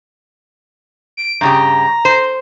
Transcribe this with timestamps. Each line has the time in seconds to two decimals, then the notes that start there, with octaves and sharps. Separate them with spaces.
1.17 D7
1.41 G2 C#3 G4 A#5
2.05 C5